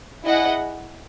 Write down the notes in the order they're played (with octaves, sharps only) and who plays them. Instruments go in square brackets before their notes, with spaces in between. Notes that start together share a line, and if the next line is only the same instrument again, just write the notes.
[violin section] E4 G#4 D#5 F#5